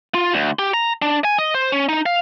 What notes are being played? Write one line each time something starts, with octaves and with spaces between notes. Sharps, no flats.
F4
D2
G4
A#5
D4
G#5
D#5
C5
C#4
D#4
F5